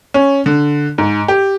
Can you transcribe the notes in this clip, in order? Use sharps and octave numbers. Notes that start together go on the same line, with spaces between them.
C#4
D3
G#2
G4